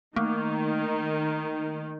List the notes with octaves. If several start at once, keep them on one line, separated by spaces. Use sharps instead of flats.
D#3 A3 A#3